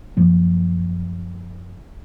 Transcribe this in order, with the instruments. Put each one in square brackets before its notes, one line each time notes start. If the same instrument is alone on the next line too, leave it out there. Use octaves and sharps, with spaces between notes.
[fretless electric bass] F#2 F3 A#3